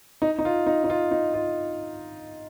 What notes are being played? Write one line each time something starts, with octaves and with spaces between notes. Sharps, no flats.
D#4
D#4
F4
D#4
D#4
F4
D#4
F4